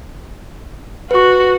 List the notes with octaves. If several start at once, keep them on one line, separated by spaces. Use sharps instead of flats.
F#4 B4 C#6